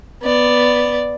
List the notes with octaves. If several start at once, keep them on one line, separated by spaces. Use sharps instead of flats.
B3 D5